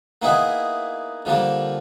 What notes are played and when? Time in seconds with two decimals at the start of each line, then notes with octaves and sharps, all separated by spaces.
0.22 A#3 B3 D#4 E4 G#4
1.25 D3 F3 G3 A#3